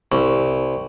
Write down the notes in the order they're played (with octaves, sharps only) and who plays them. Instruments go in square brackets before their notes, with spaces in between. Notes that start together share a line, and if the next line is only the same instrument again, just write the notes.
[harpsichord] C2